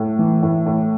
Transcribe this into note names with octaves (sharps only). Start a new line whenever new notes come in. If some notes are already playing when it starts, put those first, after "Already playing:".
Already playing: A2
E3
A2
A2